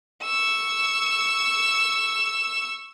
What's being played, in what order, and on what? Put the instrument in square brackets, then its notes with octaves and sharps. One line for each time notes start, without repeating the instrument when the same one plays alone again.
[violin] C#6 E6